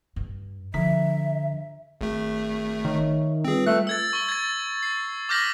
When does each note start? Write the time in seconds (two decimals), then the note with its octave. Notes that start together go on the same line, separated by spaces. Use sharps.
0.16 G2
0.74 D3 F3 E5 A#5 B6
2.01 G#1 A3 G#4
2.85 D#3 C#5 E5 C#6
3.44 G3 C4 F4 G#4 B4
3.66 A3 F#6
3.87 E6 G#6 A6
4.13 C#6 G7
4.29 G#6 A6
4.83 C7
5.29 D6 F6 G6 A#6 B6 F#7